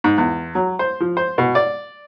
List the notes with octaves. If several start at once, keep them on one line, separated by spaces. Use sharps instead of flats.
G#2
E2
F#3
C5
F3
C5
B2
D5